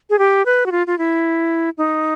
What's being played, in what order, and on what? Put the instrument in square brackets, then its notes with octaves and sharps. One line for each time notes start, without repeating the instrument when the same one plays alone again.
[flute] G#4
G4
B4
F#4
F4
F4
E4
D#4